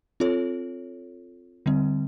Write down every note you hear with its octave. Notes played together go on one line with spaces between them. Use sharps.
C4 F4 A4 C#5
D3 G3 C4